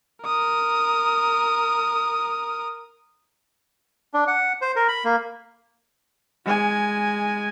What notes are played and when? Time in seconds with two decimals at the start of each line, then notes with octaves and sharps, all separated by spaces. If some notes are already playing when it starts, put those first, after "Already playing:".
0.23 A#4 D#6
4.14 D4
4.28 F#5
4.62 C5
4.76 A#4
4.89 B5
5.05 A#3
6.45 G#3 G#5